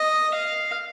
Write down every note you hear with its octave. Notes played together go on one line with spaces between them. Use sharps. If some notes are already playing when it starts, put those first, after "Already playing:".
Already playing: D#5
F5